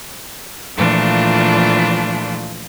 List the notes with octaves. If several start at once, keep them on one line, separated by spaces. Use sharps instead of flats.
A#2 E3 F3 A3 D4 F4